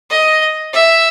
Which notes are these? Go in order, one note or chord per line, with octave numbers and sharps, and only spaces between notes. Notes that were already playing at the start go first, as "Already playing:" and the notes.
D#5
E5